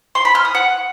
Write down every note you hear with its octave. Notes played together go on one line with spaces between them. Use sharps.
C6
B5
F6
D#6
F#5